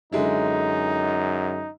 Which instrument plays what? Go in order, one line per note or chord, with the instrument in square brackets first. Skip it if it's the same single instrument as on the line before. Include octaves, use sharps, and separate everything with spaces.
[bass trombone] F#2 [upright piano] D3 G#3 E4 [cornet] D#4